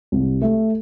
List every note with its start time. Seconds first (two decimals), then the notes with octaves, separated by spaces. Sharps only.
0.12 C2
0.41 A3